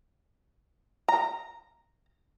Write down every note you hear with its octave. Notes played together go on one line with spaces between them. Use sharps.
A#5